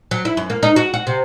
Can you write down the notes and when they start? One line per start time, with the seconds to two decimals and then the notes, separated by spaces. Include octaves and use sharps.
0.11 F#3
0.25 E4
0.37 F#2
0.50 A#3
0.63 D#4
0.76 F#4
0.94 F#4
1.07 C3